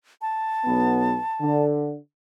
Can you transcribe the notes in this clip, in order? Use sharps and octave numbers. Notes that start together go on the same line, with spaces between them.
A5
B1 B3
D3